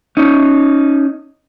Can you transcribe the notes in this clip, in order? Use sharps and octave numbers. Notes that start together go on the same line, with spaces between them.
C#4 D#4